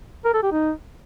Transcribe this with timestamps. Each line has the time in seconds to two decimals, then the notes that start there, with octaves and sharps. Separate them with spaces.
0.25 A#4
0.34 A4
0.43 G4
0.52 D#4